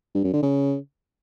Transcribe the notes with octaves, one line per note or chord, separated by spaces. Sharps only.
G2
F#2
D3
C#3